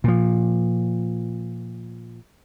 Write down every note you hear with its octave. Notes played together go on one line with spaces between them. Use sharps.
A#2 F3